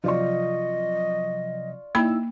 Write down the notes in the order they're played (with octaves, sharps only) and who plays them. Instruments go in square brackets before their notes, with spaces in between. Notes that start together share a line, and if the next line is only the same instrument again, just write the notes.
[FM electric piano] C3 F3 F#3 [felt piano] F4 D5 C#6 [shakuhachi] D#5
[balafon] A#3 B5 [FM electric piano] D#4 E4 E6